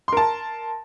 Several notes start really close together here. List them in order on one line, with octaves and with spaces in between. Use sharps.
C6 A#4 A5